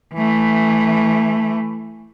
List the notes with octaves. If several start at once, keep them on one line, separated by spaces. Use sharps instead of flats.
E3 A3